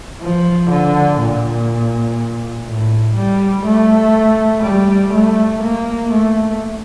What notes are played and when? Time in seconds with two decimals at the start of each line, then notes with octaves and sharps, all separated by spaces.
0.22 F3
0.70 D3
1.20 A#2
2.68 A2
3.16 G3
3.66 A3
4.64 G3
5.13 A3
5.62 A#3
6.11 A3